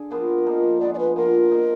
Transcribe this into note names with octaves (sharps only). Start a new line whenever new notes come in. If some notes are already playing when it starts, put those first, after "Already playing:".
Already playing: D3 G#4
F3 B3 D4 A#4
F3 A#3 D#4
D3 F3 G#3 B3 D5
D5
B4
F3 A#3 F4 A#4
F3 A#3 D#4